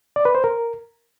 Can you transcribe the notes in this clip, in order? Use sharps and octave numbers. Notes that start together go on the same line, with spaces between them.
D5
B4
C5
A#4